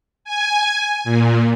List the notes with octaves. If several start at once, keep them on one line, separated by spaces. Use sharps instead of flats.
G#5
A#2